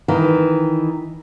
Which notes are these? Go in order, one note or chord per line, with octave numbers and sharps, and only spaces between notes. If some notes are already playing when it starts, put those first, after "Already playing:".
D#3 E3